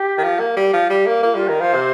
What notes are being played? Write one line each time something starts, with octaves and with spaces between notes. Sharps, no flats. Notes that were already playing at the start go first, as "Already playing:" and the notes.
Already playing: G4
D#3
F3
A#3
G3
F3
G3
A#3
A#3 F4
G3 F4
D#3 A#4
F3 C5
C3